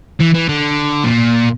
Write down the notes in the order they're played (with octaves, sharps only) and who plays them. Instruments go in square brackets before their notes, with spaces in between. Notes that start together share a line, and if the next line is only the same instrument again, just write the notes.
[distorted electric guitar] E3
E3
D3
A#2